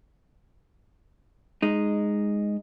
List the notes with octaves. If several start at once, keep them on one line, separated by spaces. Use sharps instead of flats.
G#3 D#4